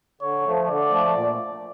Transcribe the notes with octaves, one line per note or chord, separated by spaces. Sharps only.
D3 C#5
F3 A3
D3 D5
F3 A3
A#2